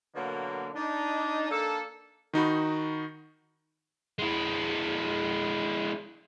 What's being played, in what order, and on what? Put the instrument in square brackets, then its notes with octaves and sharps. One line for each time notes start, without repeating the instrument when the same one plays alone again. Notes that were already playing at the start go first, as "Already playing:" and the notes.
[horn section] B2 D3 F#3 A#3
D4 D#4
A#3 D4 A4
[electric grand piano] D#3 D#4 F#4 B5
[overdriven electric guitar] G#3 E4